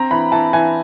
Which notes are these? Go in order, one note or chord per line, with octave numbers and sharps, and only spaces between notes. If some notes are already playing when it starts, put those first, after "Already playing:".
Already playing: C4 A#5
E3 B5
E3 A5
E3 G#5